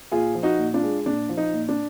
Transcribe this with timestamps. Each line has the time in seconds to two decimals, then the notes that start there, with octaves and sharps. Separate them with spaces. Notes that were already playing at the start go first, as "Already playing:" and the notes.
0.11 A#2 F4 G#4
0.35 F3
0.43 D#4 F#4
0.58 A#2
0.74 D4 F4
0.82 G#3
1.06 A#2 D4
1.29 F3
1.37 D#4
1.53 A#2
1.69 D4